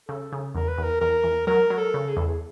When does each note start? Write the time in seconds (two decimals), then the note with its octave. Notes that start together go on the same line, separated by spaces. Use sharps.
0.08 C#3 A4
0.32 C#3
0.55 E2 A#4
0.68 B4
0.78 E2
0.83 A#4
1.01 E2 A#4
1.24 E2
1.47 F#3 A#4
1.70 F#3
1.78 A4
1.94 C#3
2.09 G#4
2.17 E2 A4
2.26 G#4